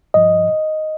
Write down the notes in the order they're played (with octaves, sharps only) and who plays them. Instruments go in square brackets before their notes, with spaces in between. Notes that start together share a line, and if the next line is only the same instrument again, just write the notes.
[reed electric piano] G2 F3 D#5